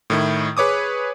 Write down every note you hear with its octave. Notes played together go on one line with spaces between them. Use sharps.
A2 D#3 E4
G#4 B4 C#5 D6 D#6